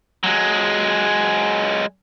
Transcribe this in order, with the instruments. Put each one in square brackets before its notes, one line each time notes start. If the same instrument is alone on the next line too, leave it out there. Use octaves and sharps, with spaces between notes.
[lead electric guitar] F#3 G#3